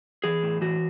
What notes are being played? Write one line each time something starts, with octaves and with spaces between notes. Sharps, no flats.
E3 G#4
A2
E3 F#4